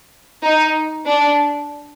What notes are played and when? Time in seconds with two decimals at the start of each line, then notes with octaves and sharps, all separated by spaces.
0.44 D#4
1.06 D4